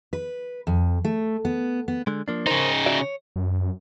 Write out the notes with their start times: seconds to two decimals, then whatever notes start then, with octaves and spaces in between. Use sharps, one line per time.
0.13 B4
0.67 F2
1.05 A3
1.45 B3
1.88 B3
2.07 D3 G#3
2.28 F3 A#3 D4
2.47 C#3 D#4 A#4 C5
2.86 F#4 D5 E5
3.01 C#5
3.36 F#2